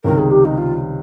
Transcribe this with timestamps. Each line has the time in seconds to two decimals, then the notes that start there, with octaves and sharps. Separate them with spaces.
0.04 C#2 C3 D#3 G3 A#4
0.18 G#4
0.31 G4
0.44 D#4
0.57 F4